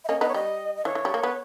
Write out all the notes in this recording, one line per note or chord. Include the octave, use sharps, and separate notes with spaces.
E5
A#3 C#4 D#5
B3 D#4 D#5
C#5
G3 D#5
D#5
E3 C#5
E3
G3
A#3
B3